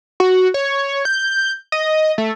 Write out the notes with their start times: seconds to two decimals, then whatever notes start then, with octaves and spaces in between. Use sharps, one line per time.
0.20 F#4
0.54 C#5
1.05 G6
1.72 D#5
2.18 A3